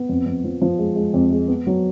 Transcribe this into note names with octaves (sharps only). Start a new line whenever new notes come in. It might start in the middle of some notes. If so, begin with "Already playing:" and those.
Already playing: B3
F2
F2
F3
F3
G#3
G#3
F2
G#3
B3
F#3